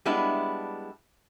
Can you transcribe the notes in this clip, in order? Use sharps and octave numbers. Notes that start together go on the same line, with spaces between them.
G3 G#3 B3 D4 E4